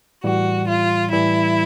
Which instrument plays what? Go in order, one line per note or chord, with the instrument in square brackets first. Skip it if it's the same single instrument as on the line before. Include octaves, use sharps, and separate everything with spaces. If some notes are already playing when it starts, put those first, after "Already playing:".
[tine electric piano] A2 E3 G3 [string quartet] F#4
[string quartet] F4
[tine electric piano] A2 E3 G3 [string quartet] E4